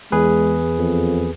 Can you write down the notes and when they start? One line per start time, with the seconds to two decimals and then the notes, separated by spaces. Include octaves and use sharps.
0.12 E2 G#3 G#4 B4
0.78 F2